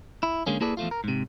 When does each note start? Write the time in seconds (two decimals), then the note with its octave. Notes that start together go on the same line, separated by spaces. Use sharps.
0.23 E4
0.47 D3 G#3 A#3 C#4
0.61 A#3 E4 G#4 A4 B4 D5
0.77 E2 F3 A3 F4
0.91 A#4
1.04 G#2 C3